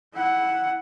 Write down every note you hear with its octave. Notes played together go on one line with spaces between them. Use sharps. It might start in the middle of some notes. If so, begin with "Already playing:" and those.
E4 F#5